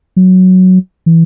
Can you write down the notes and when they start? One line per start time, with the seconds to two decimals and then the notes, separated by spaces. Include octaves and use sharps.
0.16 F#3
1.06 E3